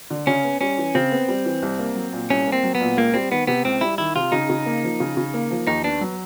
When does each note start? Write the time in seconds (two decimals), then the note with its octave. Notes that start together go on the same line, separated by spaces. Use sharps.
0.10 D3
0.27 C#3 C#4
0.44 B3
0.61 G3 C#4
0.78 E3
0.95 C#3 C4
1.12 B3
1.28 G3
1.45 E3
1.62 C2
1.79 A#3
1.96 F#3
2.13 A#2
2.30 C2 C#4
2.47 A#3
2.52 C4
2.63 F#3
2.75 B3
2.81 A#2
2.97 C#2 A#3
3.14 G3 C4
3.31 D#3 B3
3.47 C3 B3
3.65 C#2 C4
3.81 G3 E4
3.98 D#3 E4
4.16 C3 F4
4.32 C#3 D#4
4.50 C#3
4.66 A#3
4.84 F3
5.00 C#3
5.17 C#3
5.34 A#3
5.51 F3
5.67 D#2 D#4
5.84 B3 D4
6.01 F#3